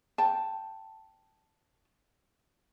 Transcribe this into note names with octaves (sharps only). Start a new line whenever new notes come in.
G5 A5